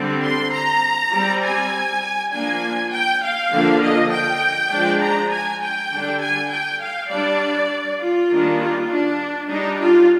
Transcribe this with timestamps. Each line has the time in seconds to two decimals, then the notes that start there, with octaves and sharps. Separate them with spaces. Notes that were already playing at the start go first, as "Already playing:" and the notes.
Already playing: D3 G3 C4
0.23 C6
0.53 A#5
1.13 G3 C4
1.43 G#5
2.31 F3 A#3 D4 G#5
2.92 G5
3.22 F5
3.51 D3 F3 A#3 D4
3.82 D#5
4.11 G5
4.71 F3 G#3 D4
5.01 A#5
5.31 G#5
5.61 G5
5.91 D3 G3 D4
6.21 G#5
6.51 G5
6.81 F5
7.10 G3 D4 D5
8.00 F4
8.30 D#3 G3 A#3 D4
8.59 F4
8.89 D4
9.49 G3 D4 D#4
9.80 F4